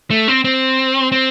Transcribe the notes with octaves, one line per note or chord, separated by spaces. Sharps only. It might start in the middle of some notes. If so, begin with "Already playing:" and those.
A3
C4
C4
C4